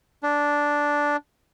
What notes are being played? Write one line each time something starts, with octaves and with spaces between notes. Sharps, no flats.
D4